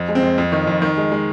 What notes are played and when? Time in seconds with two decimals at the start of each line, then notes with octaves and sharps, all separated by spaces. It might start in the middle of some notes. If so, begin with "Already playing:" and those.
Already playing: F2
0.09 G#3
0.15 C4
0.23 F2
0.38 F2
0.52 D#3
0.67 F2
0.82 D#3
0.97 G#3
1.12 G#3